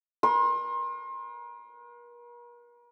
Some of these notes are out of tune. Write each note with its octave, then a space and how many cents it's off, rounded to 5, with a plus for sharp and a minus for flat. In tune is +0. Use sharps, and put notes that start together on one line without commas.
A#4 +45 C6 +35